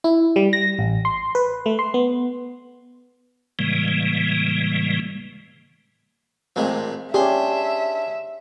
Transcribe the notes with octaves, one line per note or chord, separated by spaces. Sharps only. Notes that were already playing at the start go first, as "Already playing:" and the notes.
E4
G3
A#6
A1
C6
B4
A3
C6
B3
A2 C#3 E3 G3 G#3 A#3
A1 A#2 G#3 C4
C#4 D4 G4 G#4 E5 C6